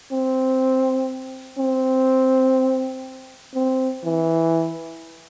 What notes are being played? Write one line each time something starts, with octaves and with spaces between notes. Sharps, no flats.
C4
C4
C4
E3